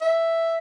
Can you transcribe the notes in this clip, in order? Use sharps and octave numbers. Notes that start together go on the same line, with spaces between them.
E5